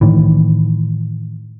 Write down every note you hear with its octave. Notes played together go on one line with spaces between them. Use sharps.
A2 D#3 E3